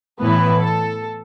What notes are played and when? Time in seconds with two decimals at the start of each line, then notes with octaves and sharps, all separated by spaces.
0.22 A2 E3 B3 E4 B4
0.62 A4